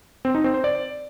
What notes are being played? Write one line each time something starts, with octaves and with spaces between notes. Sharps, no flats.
C4
D#4
C4
C5
D5